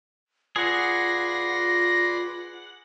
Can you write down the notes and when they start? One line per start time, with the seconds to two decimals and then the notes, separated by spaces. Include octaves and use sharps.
0.56 F4 G#4 B4 D5 F#5 C6 A#6